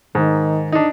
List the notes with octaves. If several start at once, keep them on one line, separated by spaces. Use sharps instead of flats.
G#2 D#3
D4 D#4